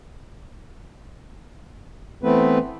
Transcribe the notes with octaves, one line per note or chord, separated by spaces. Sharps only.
E3 A3 B3 C4 B4